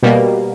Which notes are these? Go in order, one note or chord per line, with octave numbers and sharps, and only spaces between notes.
B2 G3 A#3